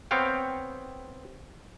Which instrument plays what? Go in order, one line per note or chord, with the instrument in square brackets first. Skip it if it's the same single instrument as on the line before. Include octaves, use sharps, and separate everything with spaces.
[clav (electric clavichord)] B3 C4 C#5 F5 G5